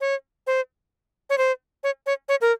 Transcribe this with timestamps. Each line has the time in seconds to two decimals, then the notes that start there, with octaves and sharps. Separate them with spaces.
0.01 C#5
0.47 C5
1.30 C#5
1.38 C5
1.84 C#5
2.06 C#5
2.29 C#5
2.41 A#4